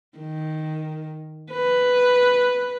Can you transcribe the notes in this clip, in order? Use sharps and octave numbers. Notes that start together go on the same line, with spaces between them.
D#3
B4